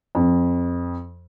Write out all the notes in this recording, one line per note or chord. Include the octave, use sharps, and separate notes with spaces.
F2